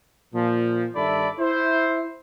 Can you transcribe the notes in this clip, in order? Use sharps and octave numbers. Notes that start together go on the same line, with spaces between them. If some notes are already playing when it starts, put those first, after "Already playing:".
A#2 F3
G2 D#3 A4 D5 E5 B5
E4 C5